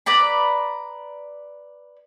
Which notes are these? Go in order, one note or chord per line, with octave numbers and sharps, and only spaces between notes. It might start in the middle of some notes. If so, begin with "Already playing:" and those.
B4 D5 A#5 B5